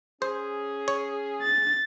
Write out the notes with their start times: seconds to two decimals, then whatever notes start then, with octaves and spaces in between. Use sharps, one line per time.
0.22 C#4 G#4 C5
0.88 C#5
1.42 A6